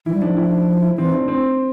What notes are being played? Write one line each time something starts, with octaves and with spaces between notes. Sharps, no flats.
E3 E4
G3
F3 D4
E4
E4
E3 C4
D4
C4